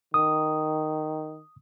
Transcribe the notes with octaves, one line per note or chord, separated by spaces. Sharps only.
D#3 D#6